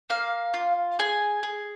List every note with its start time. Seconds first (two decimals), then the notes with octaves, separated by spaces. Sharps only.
0.10 A#3 F5
0.54 F4
0.99 G#4 G#5
1.43 G#4